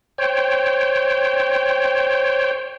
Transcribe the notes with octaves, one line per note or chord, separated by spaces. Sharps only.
C5 C#5 G5